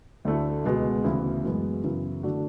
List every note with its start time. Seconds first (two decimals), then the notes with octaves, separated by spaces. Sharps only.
0.25 D2 D3 A3 E4
0.65 C#2 B2 G#3 B3 F#4
1.04 D2 C#3 E3 B3 E4
1.44 F#2 E3 G#3 B3
1.84 F#2 C#3 E3 B3 E4
2.23 D3 A3 D4 F#4